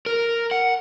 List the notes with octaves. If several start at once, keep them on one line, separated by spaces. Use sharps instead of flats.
A#4
F#5